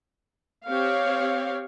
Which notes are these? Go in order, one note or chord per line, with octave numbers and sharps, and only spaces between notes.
C4 G4 C#5 F5